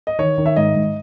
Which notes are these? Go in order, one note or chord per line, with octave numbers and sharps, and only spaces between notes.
D#5
D#3 C#5
D#3
E5
G#2 D#5
G#2